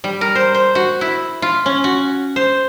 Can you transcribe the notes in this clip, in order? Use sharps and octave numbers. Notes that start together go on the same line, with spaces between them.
G3
A#4
C5
C5
F#4
E4
F4
C#4
F#4
C5